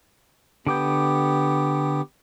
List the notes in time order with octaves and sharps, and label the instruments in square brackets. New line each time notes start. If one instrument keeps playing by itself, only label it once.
[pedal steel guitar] D3 D6 G6 [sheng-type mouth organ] B3 G4